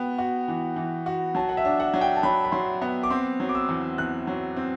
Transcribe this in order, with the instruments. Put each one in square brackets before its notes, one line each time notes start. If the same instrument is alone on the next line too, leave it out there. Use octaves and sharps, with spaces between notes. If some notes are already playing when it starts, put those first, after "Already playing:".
Already playing: [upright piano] B3 F#4 [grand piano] G5
[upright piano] F#4
E3
E3
F#4
[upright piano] F#3 [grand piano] A5
[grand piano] F#5
E5
[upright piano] D4
[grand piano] F#5
[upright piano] F#3
[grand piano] G5
A5
[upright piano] F#3 [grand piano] B5
[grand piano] B5
[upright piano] F#3 [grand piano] C6
[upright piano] B3
[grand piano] D6
[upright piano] C4 [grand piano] C6
[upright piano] F#3
[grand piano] D6
E6
[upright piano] E2
[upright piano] E2 [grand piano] F#6
[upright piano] F#3
C4